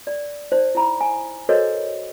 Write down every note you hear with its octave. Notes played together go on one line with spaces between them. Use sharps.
D5
D#4 C5 D5
E4 A#5 B5
G#5
F#4 A4 A#4 C5 C#5 D#5